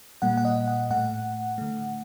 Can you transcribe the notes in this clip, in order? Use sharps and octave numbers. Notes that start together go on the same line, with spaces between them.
A#2 G3 A#3 F#5
F#5
D#5
F#5
A2 A3 F#5
D3 A3